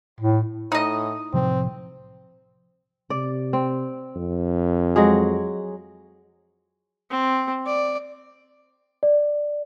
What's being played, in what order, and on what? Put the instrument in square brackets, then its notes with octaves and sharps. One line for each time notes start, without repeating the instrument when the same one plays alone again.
[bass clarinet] A2
[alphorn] A2 [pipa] D#4 D#5
[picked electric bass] A2 C3 F3 [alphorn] C4
[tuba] C3 [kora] D5
[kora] C4
[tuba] F2
[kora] F#3 G#3 G#4
[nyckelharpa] C4
D5
[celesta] D5